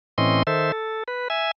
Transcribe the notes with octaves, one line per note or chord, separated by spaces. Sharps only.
A2 E3 C4 C#4 D#5 C6
D#3 A4 C5 E5
A4
B4
E5 G#5